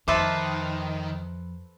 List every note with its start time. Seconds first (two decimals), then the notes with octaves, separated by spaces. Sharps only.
0.08 F2 D#3 A4 B4 C5 E5 D6